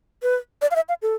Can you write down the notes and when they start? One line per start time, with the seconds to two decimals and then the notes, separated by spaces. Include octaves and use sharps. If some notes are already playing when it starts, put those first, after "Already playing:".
0.23 B4
0.62 D5
0.71 F5
0.76 E5
0.89 F5
1.02 A4